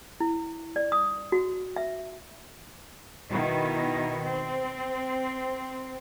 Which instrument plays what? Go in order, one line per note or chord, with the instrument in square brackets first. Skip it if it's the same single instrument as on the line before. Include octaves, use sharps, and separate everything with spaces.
[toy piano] E4
D5
D#6
F#4
E5
[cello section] B2 D#3 E4
C4